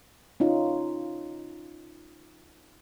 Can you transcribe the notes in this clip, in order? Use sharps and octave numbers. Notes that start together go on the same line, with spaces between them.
C#4 D#4 F4